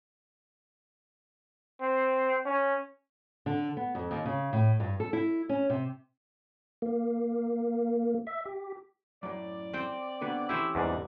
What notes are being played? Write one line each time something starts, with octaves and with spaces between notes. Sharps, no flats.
C4
C#4
D3
B3
F2
D#2
C#3
A2
G2
A4
E4
C#4
C3
A#3
E5
G4
F#2 A2 D5
C4 G5
D3 B3 F#4
E3 A3 C#4 E4 G4 C5
E2 G#2 G3 D4